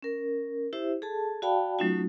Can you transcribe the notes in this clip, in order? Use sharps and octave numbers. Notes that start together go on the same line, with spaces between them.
C#4 A#4
E4 G4 C5 E5
G#4 A4 A5
F#4 D5 F5 G5 A5 B5
F#3 A3 C#4 D#4 F4 F#4